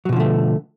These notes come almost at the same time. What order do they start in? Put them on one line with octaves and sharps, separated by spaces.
F#3 B2 F3 D3 A3